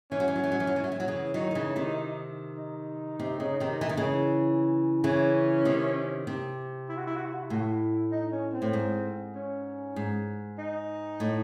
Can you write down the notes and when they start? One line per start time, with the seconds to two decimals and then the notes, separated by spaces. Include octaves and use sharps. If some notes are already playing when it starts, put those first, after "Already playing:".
0.11 E3 C#4
0.20 F#3
0.28 E3
0.36 F#3
0.44 E3
0.52 F#3
0.60 E3
0.67 F#3
0.76 E3
0.84 F#3
0.92 E3
1.00 F#3
1.08 C#3 E3
1.34 D#3 F#3 D#4
1.51 D#3
1.55 C#3 E3
1.76 C3 D#3
2.57 D#4
3.20 C3
3.40 C#3
3.60 C3 D#3
3.81 E3
3.89 D#3
3.97 C#3 E3
5.04 C#3 E3 C#4
5.65 C3 D#3
6.27 C3
6.89 E4
6.97 F#4
7.07 E4
7.16 F#4
7.25 E4
7.34 F#4
7.43 E4
7.50 A2 F#4
7.61 E4
8.11 D#4
8.32 C#4
8.53 C4
8.62 A2
8.73 G#2
9.35 C#4
9.96 G#2
10.58 D#4
11.20 A2